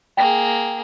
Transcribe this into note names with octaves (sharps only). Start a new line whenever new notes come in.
A#3 G#4 G5